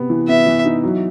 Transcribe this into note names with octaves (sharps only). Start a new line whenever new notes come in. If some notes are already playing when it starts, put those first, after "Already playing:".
Already playing: C3 B3
E3
B3 E5
E3
D#4
F#3